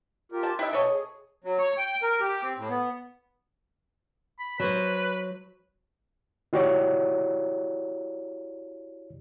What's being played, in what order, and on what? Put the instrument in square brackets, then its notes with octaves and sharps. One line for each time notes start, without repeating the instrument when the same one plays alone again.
[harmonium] F4 G4 A#4
[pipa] A5
[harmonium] D#4 B4 G5 [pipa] E4 E5
[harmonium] B2 [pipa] A4 C#5 D#5
[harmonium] G#4
[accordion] F#3
C#5
G5
A#4
G4
C4
A2
B3
[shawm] B5
[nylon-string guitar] F#3 C5 [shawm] B4
[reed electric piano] E4 F#4 G4 C#5 D5